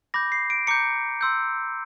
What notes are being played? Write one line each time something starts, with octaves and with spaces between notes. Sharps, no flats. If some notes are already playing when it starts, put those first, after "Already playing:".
B5 D6 G6 A#6
C7
D7
A#5 D6 G6 C#7
C6 E6 G6